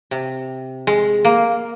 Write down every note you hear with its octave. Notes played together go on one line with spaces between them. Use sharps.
C3
G#3
A#3